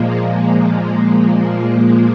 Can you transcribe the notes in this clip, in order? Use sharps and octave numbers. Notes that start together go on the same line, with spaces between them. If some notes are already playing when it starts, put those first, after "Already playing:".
Already playing: A#2 F3 G#3 A#3